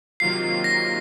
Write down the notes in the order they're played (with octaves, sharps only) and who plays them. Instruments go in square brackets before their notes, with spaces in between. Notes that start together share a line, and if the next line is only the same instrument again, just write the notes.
[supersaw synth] C3 D#3 F#3 A#3 F4 [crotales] C7
[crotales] A#6